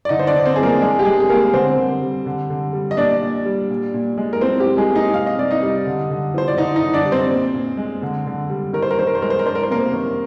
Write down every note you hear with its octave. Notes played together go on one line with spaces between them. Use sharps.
D5
D3 D#4 D#5
C5
D4 D5
D3
C4 C5
F3 G#4
A#3 A#4
G#3 D4 G#4
G4
C3 G#3 G#4
G#4
G3 A#3 A#4
D3 C4 C5
D3
G3
D3
D3
G3
D#5
A#2 D4 D5
A#2
G3
A#2
A#2
G#3
A#4
F3 C4 C5
G4
F3
G#3 G#4
A#3
D#4 D#5
C3 F5
D#5
C3 D5
D#4 D#5
G3
D3
D3
F3 C5
D5
D3 D#4 D#5
D#4 D#5
D3
D4 D5
G3
C4 C5
A#2
A#2
G#3
D3
D3
G3
D#3 A#4
C5
A#4
D#3 C5
A#4
C5
G#3 A#4
C5
A#4
D4 C5
A#4
C5
C3 A#3 A#4
D#3